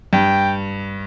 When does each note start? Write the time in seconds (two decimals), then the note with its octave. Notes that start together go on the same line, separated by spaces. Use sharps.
0.13 G2 G5